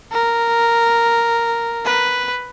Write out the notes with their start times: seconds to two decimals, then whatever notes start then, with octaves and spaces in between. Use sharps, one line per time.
0.12 A#4
1.85 B4